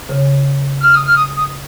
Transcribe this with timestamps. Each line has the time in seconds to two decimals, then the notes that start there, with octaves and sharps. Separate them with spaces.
0.09 C#3
0.81 F6
0.95 D#6
1.05 F6
1.15 D#6
1.36 D#6